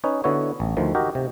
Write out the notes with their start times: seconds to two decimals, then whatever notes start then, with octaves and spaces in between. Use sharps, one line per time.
0.04 C#4 D#4 B4 C#5
0.24 D3 B3 E4 F#4 C#5
0.60 A1
0.77 D2 D#3 F3 A3
0.95 D#4 F#4 G4 A#4
1.15 C3